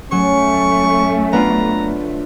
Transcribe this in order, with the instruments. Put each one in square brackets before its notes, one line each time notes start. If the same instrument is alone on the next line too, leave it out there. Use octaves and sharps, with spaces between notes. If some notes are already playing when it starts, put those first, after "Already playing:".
[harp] F#3 [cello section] A3 [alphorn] C#4 [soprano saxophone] C#6
[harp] B3 D4 F4 [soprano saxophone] A#5